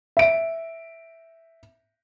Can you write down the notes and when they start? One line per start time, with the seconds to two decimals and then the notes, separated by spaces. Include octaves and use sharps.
0.17 E5 D7